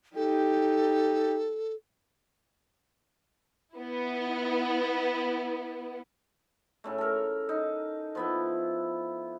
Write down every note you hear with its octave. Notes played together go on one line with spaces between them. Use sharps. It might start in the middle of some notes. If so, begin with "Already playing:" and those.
D#4 G4 A4
B3 E4
A2 C#3 A3
A4 A#4
D#4
F3 B3 E4